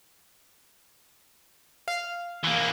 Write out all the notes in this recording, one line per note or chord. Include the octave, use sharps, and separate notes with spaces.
F5
E3 A#3